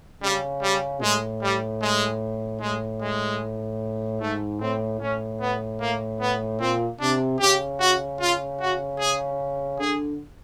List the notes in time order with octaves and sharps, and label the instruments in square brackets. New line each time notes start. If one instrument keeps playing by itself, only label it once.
[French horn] C#3 [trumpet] G3
[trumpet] G3
[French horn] A2 [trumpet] G#3
[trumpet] G3
G#3
[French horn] A2 [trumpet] G#3
[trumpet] G#3
[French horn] G#2 [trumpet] A3
[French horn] A2 [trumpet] C4
[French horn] A2 [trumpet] C#4
[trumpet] B3
A#3
B3
[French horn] A#2 [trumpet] C4
[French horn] C3 [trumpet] D4
[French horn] C#3 [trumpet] G4
[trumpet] F#4
F4
F#4
G#4
[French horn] D3 [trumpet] G#4